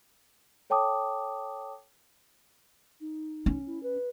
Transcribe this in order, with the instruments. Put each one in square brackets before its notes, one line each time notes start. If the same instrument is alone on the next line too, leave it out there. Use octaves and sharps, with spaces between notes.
[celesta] A4 C#5 G5 A5 D6 D#6
[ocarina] D#4
[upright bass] C#4
[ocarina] E4
B4